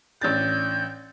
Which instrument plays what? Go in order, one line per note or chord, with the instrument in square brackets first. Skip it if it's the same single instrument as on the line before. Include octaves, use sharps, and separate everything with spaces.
[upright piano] A1 D4 A6 [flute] G6